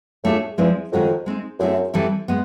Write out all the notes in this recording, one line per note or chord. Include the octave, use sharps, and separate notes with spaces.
A2 A3 D4 F4 G#4
E2 F3 G#3 C4 E4
F2 D#3 G#3 C#4 F#4 A#4
G#3 C4 D#4
F#2 A3 C4 E4 G#4
E3 G3 C4 E4 A4
G#3 B3